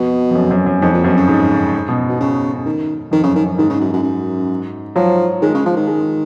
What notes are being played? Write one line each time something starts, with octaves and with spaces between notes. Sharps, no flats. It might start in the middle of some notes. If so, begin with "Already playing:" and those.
Already playing: F2 B2
F2
F#2
F#2
F#2
F2 G#2
A#2
F#2 B2
C#3
G#2
B2
B2
C#3
D#3
F2 D#3
F#2 C#3
F2 D#3
F#2
G#2 D#3
C#3
F#2
F#2
F#2
F3 F#3
D#3 G#3
C#3
F3
D#3
G#3